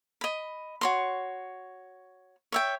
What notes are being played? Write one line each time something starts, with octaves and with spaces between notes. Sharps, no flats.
D#5 B5
F#4 C#5 C6
C#5 E5 G5